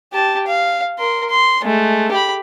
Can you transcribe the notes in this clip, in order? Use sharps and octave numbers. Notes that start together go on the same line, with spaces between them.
G4 A5
F5
A#4 C6
C6
G#3 A3
G4 B5